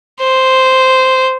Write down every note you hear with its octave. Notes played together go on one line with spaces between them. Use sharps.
C5